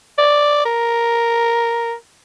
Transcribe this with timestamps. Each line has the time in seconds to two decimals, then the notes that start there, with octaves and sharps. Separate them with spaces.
0.19 D5
0.66 A#4